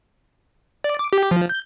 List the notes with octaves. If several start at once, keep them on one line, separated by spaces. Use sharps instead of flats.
D5
D6
G4
F3
G6